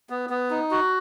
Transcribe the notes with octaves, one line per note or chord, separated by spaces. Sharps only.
B3
B3
D#4
F#4